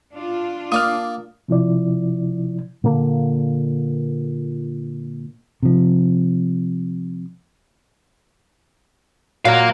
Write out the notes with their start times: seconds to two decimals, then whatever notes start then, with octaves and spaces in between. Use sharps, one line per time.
0.15 D4 F4
0.72 A#3 D5 D#6 F6
1.48 C3 F3 E4 D5
2.84 A#2 D3 A#3
5.63 C3 F3
9.45 A#2 F#3 A#4 F5